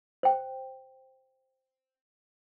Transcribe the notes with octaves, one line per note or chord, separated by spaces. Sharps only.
C5 G5